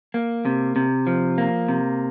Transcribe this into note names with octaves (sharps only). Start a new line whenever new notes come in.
A#3
C3
C3
F3
A#3
C3